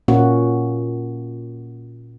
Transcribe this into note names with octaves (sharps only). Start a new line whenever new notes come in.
A#2 A#3 C#4 F#4